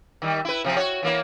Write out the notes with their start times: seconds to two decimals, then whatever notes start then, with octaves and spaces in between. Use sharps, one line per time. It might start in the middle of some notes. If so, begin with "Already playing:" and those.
0.22 D#3 G3
0.45 E4 B4
0.64 C3 F3 C4
0.76 F#4 C#5
1.03 E3 A#3 E4